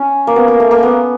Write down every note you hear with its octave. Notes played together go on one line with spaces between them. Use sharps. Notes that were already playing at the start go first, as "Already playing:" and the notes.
Already playing: C#4
A#3
B3
A#3
A3
A#3
B3